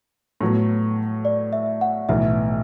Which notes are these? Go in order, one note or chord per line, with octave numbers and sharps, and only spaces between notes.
A2 F#3 B3
D5
E5
F#5
B1 A2 E3 B3 E5